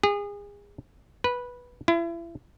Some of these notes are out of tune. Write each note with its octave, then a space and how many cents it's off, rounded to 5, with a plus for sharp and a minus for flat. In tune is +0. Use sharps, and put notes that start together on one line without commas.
G#4 -30
B4 -10
E4 +35